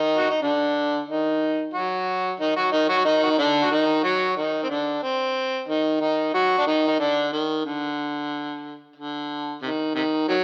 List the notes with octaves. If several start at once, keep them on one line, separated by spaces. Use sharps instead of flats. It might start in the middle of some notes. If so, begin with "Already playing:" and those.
Already playing: D#3 D#4
F#4
D#4
D3 D4
D#3 D#4
F#3 F#4
D#3 D#4
F#3 F#4
D#3 D#4
F#3 F#4
D#3 D#4
F#4
D#4
D3 D4
F#4
D#3 D#4
F#3 F#4
D#3 D#4
C4
D3 D4
C4
D#3 D#4
D#3 D#4
F#3 F#4
D4
D#3 D#4
D#4
D3 D4
D#3
D3
D3
C3 D#3
C3 D#3
D#3 F#3